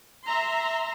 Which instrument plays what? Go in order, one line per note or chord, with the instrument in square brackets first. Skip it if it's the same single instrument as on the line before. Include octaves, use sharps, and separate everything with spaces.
[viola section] E5 A#5 C6